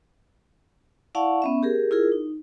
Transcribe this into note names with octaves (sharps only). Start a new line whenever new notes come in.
E4 D5 F5 F#5 A5 C#6
B3 C#4 E5
G4 G#4 A#4
E4 F4 G#4 A#4
D#4